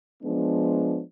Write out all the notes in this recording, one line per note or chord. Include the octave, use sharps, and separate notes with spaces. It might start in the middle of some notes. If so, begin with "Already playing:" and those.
F3 G#3 B3 D4